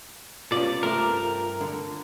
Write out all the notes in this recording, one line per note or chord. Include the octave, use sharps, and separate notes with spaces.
C3 B3 C#4 F4 D5
G2 A3 C4 A#4
D3